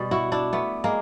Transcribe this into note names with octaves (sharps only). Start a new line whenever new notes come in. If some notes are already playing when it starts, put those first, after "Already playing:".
Already playing: B2 G3
E4 F#4
D4 E4
A3 B3
G#3 A#3